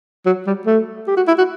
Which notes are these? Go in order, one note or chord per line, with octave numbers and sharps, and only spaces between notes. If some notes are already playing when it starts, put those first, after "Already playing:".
F#3
G3
A3
G4
F#4
E4
F#4